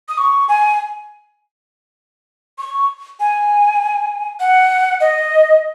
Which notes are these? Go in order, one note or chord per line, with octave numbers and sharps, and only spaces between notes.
D#6
C#6
G#5
C#6
G#5
F#5
D#5